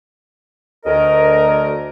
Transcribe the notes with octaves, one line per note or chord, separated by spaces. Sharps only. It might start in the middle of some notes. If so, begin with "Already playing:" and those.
D2 A#4 D#5